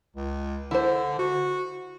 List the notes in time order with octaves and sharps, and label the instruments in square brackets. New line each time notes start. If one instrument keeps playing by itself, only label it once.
[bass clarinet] C#2
[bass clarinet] D3 [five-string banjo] E4 C5
[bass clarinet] F#4